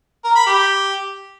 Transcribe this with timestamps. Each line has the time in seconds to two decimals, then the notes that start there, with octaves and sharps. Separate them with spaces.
0.24 A#4
0.36 B5
0.47 G4